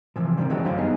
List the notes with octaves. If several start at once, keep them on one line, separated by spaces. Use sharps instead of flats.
C3 E3 F3
D3 D#3 G3 A#3 C4
D3 E3 F#3 G#3 C4
F#2 D3 G4 C5 F5
G3 B3 D#4 G#4